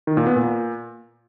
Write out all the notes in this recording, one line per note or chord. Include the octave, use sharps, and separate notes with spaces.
D#3
A#2
B3
A#2